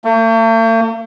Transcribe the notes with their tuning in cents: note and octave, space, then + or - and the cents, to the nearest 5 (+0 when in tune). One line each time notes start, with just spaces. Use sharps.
A3 +45